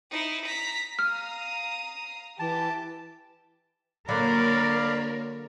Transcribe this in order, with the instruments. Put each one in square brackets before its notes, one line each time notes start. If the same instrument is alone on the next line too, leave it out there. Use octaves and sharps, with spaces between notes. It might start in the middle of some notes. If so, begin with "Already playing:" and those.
[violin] D#4 E4
A#5 B6
[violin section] F5 A#5 D#6 [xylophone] F6
[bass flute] E3 [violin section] G4 D6 [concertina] A5
[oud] D3 F#3 [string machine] A#3 C#5 [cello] A#4 [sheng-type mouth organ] D5 F5 B5